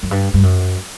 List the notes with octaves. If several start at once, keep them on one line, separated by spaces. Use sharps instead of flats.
F#2
G2
G2
F#2